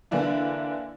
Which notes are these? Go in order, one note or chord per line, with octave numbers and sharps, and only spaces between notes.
D3 E3 A#3 D4 E4